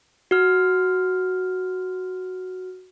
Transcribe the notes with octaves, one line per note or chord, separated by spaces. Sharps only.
F#4 F6